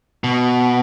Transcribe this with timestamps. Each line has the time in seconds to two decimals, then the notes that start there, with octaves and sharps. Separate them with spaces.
0.24 B2